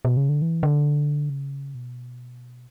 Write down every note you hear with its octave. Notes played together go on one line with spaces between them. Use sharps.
B2
C#3
D3
E3
D3
C#3
B2